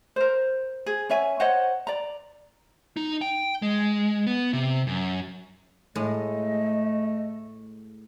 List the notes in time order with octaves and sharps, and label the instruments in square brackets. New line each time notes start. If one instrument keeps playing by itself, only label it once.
[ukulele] A#4 C5
G#4
C#4 C#5 E5 G#5
C5 C#5 D#5 F#5
D5 A#5
[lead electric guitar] D#4
G5
G#3
B3
C3
F#2
[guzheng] A2 G#3 [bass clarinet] A3 [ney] D#5